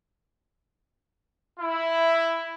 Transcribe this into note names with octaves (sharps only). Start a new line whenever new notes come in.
E4